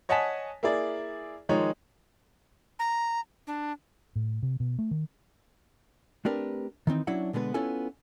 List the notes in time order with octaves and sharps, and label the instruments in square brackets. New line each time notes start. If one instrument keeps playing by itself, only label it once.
[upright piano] C#5 D#5 F#5 G#5 A5 B6
A#3 E4 G#4 D5
D#3 F3 G#3 D#4 C#5
[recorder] A#5
D4
[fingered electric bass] A2
C3
B2
A3
D#3
[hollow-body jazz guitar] A3 C4 D4 G4 A#4 B4
D#3 E3 C4 D#4
F#3 C#4 D4 E4 F#5
B2 D3 G#3 B3 B4
B3 C#4 E4 F4 A4 G#5